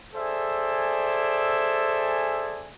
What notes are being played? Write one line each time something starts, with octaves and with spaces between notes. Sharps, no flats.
G#4 A4 C5 D5 E5 G#5